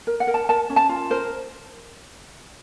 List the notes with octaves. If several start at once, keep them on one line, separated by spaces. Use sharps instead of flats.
A#4
F#5
A#4
A5
A#4 A5
C#4
A5
F4
A#4 C5